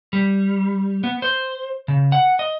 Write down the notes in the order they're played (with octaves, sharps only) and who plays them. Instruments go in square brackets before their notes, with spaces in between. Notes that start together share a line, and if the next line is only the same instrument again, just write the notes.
[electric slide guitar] G3
B3
C5
C#3
F#5
D#5